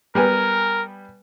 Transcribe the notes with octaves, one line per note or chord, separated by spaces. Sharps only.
G3 B3 A#4 G#5